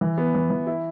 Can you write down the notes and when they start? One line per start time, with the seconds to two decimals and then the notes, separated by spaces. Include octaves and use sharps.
0.01 E3
0.18 B3
0.35 E3
0.50 E3
0.67 E4